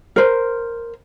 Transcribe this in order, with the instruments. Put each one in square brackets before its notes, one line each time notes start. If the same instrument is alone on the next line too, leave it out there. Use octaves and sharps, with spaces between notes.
[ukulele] A#4 C5